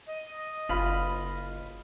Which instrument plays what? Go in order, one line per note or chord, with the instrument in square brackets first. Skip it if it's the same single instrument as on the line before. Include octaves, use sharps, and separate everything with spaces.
[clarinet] D#5
[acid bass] F#1 [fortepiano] F4 B5